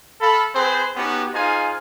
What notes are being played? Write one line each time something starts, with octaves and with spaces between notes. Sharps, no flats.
A4 F5 B5
C4 G#4 B4 C5
B3 C#4 D#4 F#4 G4
D#4 F4 G#4 C5 F5 G#5